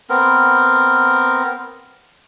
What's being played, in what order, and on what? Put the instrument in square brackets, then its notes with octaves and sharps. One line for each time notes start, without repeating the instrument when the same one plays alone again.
[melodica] B3 C4 A#4